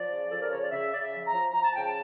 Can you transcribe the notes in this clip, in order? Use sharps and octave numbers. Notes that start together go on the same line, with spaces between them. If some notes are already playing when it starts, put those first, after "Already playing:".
Already playing: F3 D5
C#3
F3 A4
A#4
C#3 C#5
D5
C#3 E5
C#3 D5
E5
F3
A#5
F3
F3 A#5
A5
C#3 G5
A5